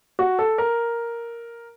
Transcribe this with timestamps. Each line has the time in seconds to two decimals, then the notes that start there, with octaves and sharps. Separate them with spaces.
0.19 F#4
0.39 A4
0.58 A#4